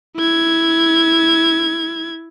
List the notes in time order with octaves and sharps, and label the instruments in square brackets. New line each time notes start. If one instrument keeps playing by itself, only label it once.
[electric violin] E4 G#6